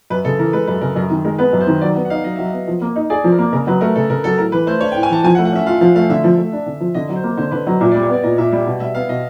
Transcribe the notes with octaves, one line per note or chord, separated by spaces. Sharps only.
F#2 B4
C#3 A4
E3 A#4
G#3 B4
F#2 B4
C#3 A#4
F#2 A#4
D#3
G#3 A#4
B3 B4
F#2
C5
D#3
F#3 D5
B3
F#5
D#4 F5
F#3 D#5
F#3 E5
D#5
B3
F3
A#3
D#4
G#4 D5
F3
A#4
A#3
C#3 A#4
F#3 B4
A3 A#4
C#3 A4
C#3 A#4
F#3 A4
A2 A#4
E3 B4
A3 C5
D4 C#5
G5
A2
G#5
E3 A5
F3 G#5
F#5
A3
F#5
C#4 E5
F4 F5
F3 F5
A3 F5
D3 E5
F3
A3
D4
D3
F3
D3 D#5
F#3
C5
A#3
D3 C5
D3 B4
F#3 D#5
A#2 E5
D5
G3
C#5
B3 D5
A#2 D#5
A#2 E5
G3 E5
B2
G3 E5
B3 F5
B2 D#5